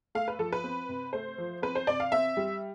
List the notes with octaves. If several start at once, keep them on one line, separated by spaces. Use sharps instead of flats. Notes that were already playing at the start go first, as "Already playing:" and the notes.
A3 F5
B4
F3 A4
B4
C4
C3
A3 C5
F3
C4 B4
C5
C3 D5
F5
C4 E5
G3